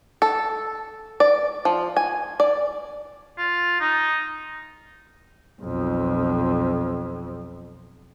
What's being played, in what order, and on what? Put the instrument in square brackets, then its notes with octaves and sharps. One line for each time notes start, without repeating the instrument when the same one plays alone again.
[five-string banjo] A4
D5
F3
G#5
D5
[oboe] F4
D#4
[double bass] B1 F2